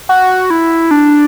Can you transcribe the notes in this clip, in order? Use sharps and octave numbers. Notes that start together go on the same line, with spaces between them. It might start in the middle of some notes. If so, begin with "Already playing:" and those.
F#4
E4
D4